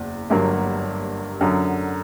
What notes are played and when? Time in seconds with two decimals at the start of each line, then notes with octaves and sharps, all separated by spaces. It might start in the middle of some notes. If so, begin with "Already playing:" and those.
Already playing: F#1 E2
0.30 G1 G2 F#3 A#3
1.41 F#2 D3 F#3